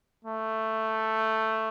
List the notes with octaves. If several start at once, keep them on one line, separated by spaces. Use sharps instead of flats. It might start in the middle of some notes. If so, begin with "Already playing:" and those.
A3